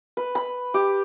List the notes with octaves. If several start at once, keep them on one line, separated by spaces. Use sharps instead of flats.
B4
B5
G4